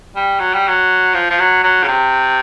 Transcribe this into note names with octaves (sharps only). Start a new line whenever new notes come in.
G3
F#3
G3
F#3
F3
F3
F#3
F#3
C#3
C3